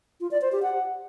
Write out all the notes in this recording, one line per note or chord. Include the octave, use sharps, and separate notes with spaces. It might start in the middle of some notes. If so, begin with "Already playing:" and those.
F4
D5
C5
G4
F#5